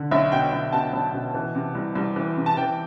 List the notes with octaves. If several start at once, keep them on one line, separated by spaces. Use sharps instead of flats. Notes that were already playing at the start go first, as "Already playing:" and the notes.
Already playing: D3
B1 E5
B2 G5
B1
B2 A5
B1
B2
E3
C3
C2
C2
E3
C3
A5
E3 G5